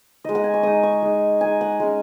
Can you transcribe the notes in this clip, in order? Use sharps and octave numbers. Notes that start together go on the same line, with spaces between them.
G#3 D#4 D#5
F#5
G#5
C#6
G#3 D#4 D#6
C#6
G#3 D#4
G#3 D#4 G#5
F#5
G#3 C#4